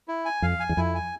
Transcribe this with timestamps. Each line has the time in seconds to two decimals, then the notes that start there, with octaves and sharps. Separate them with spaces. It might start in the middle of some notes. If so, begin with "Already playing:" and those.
0.08 E4
0.25 G#5
0.42 F2 F5
0.60 G#5
0.69 E2
0.77 F2 E4
0.95 G#5